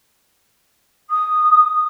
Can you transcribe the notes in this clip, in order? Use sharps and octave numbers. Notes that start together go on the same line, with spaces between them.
D#6